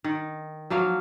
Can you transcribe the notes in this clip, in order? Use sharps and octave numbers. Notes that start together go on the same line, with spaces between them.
D#3
F3 F#3 A#3 F5